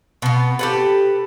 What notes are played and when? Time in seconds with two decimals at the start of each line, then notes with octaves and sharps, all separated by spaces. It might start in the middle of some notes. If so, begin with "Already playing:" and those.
0.22 B2 B3
0.59 G4 A4 B4